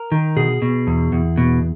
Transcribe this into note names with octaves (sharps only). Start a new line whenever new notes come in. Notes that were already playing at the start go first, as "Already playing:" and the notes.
Already playing: A#4
D#3
B2 G#4
B2
E2
E2
B2